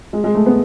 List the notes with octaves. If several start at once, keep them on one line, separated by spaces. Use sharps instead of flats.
G#3
G#3
A3
B3